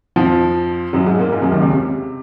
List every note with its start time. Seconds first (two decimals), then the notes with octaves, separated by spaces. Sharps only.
0.16 F2 F3
0.93 F#2 F#3
1.06 G#2 G#3
1.19 A#2 A#3
1.32 G#2 G#3
1.42 F#2 F#3
1.52 D#2 D#3
1.61 C#2 C#3
1.71 C3